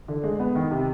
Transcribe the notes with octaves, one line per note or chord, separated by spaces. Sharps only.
D3
G#3
B3
D#3
C3